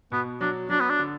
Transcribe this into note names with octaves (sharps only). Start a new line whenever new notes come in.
B2 B3
F#3 D4
F#3 D4
B3
D4
D3